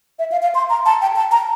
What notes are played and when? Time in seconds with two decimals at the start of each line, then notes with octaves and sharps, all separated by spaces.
0.19 E5
0.32 F5
0.42 F5
0.55 C6
0.70 A#5
0.86 A5
1.02 G5
1.16 A5
1.31 A#5